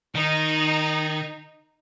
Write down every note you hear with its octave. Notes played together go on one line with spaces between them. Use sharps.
D#3 D#4